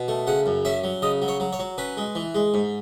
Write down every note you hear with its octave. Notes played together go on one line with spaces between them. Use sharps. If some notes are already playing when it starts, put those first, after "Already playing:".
Already playing: B2
A3
C#3 F#5
F#2
C#4 E5
F#3
C#3 D#5
F#3
C#5
F#3
C#5
F#3
C#4 B4
G#3
E3
G#3
G#2